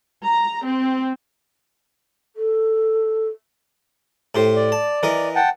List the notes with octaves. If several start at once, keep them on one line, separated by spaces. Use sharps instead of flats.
A#5
C4
A4
A2 G4 C5
D5
A5
E3 A#4 D#5
F#5 G5 A5